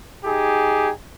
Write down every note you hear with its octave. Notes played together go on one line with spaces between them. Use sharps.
D#4 G4 G#4